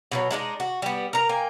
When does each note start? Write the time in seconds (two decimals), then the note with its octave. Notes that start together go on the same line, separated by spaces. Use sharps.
0.12 B2 E3 F#3
0.31 G#3 B3 D4 D#4
0.60 F#4
0.82 G3 B3
1.13 A#4 A#5
1.29 A#3 G5 G#5